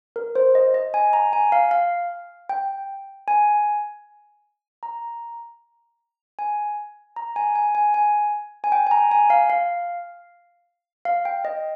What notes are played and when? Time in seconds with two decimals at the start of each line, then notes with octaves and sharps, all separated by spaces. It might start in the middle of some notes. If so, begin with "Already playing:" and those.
0.16 A#4
0.35 C5
0.55 D#5
0.74 D#5
0.94 G#5
1.13 A#5
1.33 G#5
1.52 F5
1.71 F5
2.49 G5
3.28 G#5
4.83 A#5
6.39 G#5
7.16 A#5
7.36 G#5
7.55 G#5
7.75 G#5
7.94 G#5
8.64 G#5
8.72 G5
8.87 G#5
8.91 A#5
9.11 G#5
9.30 F5
9.50 F5
11.05 F5
11.25 G5
11.45 D#5